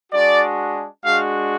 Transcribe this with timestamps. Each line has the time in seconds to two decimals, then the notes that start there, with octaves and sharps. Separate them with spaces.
0.11 G#3 D4 F#4 D5
1.03 G#3 D4 F#4 F5